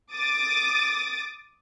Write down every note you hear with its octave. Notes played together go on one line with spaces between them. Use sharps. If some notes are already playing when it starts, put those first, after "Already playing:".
D6 D#6 A6